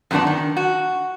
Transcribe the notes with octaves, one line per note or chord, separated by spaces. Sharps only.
F#2 A#2 D#3 B3 D4
D#3
F#4